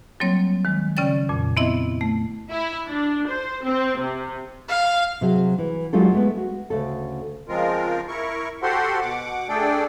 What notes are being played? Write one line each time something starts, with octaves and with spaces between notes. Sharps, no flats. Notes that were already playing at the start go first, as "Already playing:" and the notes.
F#3 G3 A#3 C4 C#5
D#3 G#3
C#3 C#4 D5 G5 A6
F2 A#2
B3 C4 E4 D#5 E5
A3
E4
D4
C5
C4
C3
F5
C3 F#3 G#4
E3
F#3 G#3 D#4 F4 G4 A4
G#3 A3 B3
F#4
D2 C#3 A4
C#3 F3 G#3 C4 F4 A#4
E4 A#4 C#6
F#4 G4 A4 C5 F#5 C6
B2 F#5 D6
A3 D4 G#4 A4 D5 G5